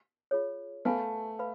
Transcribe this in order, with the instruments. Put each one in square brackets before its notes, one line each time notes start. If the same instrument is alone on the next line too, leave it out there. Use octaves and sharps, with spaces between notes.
[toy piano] F4 G#4 C#5
[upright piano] A3 [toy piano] B4 F5 G#5 B5
[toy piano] B4 F5 B5